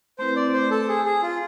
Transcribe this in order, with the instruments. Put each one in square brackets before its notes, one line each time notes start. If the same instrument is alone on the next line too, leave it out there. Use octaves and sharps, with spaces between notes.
[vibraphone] A3 C4 E4 B4 [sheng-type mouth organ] C5
[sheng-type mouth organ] D5
C5
A4
G#4
G#4
F4